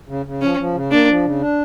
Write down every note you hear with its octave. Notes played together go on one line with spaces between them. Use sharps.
C#3
C#3
F3 C#4
F3
C#3
A#3 D4
F3
C#3
D4